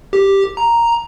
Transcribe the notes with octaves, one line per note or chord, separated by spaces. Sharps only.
G4
A#5